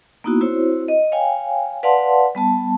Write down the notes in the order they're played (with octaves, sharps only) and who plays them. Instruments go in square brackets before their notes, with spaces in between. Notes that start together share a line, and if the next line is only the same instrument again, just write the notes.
[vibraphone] A#3 B3 D#4 E4 F#4
C4 E4 F#4 C5 C#5
D#5
C#5 F5 G5 G#5
B4 D5 F5 F#5 A5 C6
G3 B3 A5